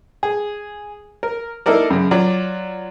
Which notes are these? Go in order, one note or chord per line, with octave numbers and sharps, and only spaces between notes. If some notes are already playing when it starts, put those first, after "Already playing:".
G#4
A#4
A#3 D#4 E4 A4 A#4 D5
F#2 C#3
F#3 F4 D5